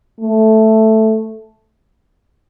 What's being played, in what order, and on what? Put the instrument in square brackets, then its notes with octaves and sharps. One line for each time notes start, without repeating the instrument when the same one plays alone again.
[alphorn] A3